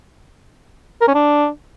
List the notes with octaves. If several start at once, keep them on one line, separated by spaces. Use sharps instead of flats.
A#4
C#4
D4